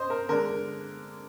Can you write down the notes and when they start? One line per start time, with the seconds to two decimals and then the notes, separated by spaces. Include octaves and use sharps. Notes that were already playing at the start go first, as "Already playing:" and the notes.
Already playing: C5 D#5
0.10 A#4
0.29 D3 G#3 D4 A#4